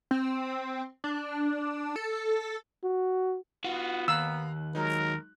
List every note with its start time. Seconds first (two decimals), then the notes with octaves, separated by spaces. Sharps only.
0.11 C4
1.04 D4
1.96 A4
2.84 F#4
3.64 B3 F4 F#4
4.08 D#2 F5 A#5 E6 F#6
4.75 F#3 G#3 D#4 A#4